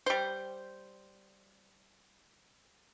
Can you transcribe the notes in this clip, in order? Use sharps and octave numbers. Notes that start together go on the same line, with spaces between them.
G3 C5